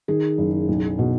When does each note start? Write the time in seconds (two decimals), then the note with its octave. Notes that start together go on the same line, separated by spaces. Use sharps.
0.08 D#3 G#4
0.38 F#1
0.69 B1
0.99 B2